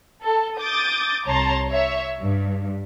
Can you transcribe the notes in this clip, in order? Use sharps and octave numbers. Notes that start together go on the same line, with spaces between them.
A4
D6 D#6 G6 A6
C2 C#5 A5 A#5 C6
C#5 E5
G2